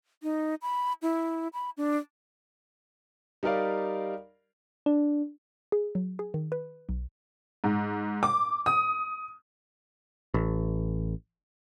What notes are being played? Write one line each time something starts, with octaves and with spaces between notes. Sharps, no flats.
D#4
B5
E4
B5
D4
G3 D#4 G4 A#4 D5 F5
D4
G#4
F#3
G#4
D#3
B4
B1
G#2
D6
D#6
A1